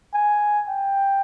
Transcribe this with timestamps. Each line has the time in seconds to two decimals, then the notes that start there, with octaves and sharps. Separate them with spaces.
0.14 G#5
0.69 G5